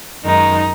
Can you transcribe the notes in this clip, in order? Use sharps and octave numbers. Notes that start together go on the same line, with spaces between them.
F#2 D#3 G#3 D#4